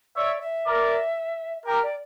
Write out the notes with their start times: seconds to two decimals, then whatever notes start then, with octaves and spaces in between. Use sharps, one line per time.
0.16 C#5 D5 E5
0.41 E5
0.66 A#4 D5
1.65 G4 A#4 A#5
1.83 D5